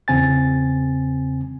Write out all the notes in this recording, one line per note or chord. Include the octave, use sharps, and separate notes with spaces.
E2 C#3 C4 G#5 A6